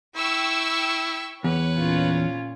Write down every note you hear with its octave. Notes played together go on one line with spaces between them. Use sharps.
E4 G5 C#6 E6
E2 B4 C#5
A#2 C#4 F4